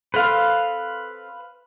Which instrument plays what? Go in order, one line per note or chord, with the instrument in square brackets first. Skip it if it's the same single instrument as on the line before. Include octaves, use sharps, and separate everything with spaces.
[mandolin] C4 A4 C5 [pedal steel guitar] B4 F5